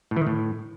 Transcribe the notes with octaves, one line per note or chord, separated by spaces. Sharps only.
A2
E3
D#3
A2